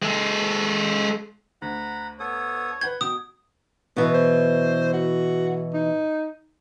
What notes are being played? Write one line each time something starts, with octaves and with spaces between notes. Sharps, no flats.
G#3 A4
D2 F#5 A#5 B5
B3 A4 C#5 D#6
B4 F#5 G6 G#6
B2 G5 D#6
B2 E3 B3
C5
F#4
D#4